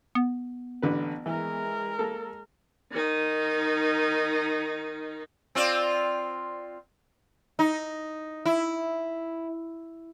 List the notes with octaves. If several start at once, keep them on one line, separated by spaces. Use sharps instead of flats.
B3
A1 D3 B4
E3 G#3 A#4
A#3 A4
D#3 D#4
C4 F4 D5
D#4
E4